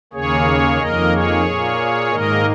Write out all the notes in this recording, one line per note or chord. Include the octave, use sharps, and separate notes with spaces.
D#2 C#3 A#3 G#4 C#5
F2 D#3 A#3 A#4 D#5
G#4 C#5
A#2 A#3
G#2 D#3 A#3 A#4 D#5